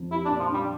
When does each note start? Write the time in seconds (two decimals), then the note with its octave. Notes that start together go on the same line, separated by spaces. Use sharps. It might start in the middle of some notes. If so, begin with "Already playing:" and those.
Already playing: F2
0.11 E4 G4
0.25 D4
0.29 A#2
0.39 F3
0.49 G3 D4